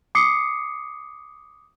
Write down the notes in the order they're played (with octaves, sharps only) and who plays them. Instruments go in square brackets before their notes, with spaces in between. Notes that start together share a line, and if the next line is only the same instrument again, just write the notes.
[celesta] D6 D#6 C7 C#7